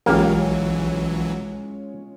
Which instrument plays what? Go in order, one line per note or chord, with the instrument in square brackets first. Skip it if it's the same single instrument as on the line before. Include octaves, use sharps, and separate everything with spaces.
[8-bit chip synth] B1 E3 F#3 [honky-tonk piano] G#3 C#4 F4 [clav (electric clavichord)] A#3 G4